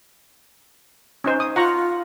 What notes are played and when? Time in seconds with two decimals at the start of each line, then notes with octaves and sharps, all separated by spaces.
1.24 C#4 D#4 C5
1.40 D#6
1.56 F4 F#5 A#5 C#6